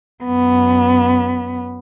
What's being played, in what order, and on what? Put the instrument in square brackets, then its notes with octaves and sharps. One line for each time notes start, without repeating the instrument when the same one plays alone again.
[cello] F#2 B3